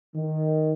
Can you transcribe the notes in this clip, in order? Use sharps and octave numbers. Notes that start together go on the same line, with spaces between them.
D#3